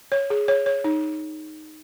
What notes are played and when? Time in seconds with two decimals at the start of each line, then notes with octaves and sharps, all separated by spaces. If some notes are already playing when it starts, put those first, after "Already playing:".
0.12 C#5
0.30 G#4
0.48 C#5
0.66 C#5
0.84 D#4